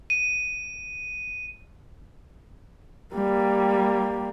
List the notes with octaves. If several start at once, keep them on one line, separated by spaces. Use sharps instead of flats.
D#7
G3 A#3